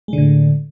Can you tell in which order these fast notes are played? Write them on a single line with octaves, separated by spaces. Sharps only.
G#3 D3 A2